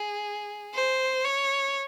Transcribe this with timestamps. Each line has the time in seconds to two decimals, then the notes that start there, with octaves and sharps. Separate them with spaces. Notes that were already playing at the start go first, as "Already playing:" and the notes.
Already playing: G#4
0.74 C5
1.24 C#5